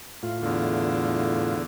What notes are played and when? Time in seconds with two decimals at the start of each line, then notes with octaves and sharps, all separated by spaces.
0.23 A2 F4
0.40 E2 D3